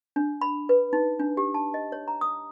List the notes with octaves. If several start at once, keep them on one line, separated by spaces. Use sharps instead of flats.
D4
B5
B4
D#4
D4
G4
A5
D#5
C#5
A#5
D#6